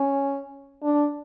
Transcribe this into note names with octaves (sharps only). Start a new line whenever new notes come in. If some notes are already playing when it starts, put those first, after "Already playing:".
Already playing: C#4
D4